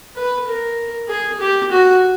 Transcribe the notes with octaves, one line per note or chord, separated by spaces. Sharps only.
B4
A#4
G#4
G4
F#4